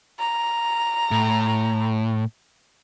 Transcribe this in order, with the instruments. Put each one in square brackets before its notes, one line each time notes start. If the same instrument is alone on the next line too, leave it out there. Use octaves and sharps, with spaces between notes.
[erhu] A#5
[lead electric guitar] A2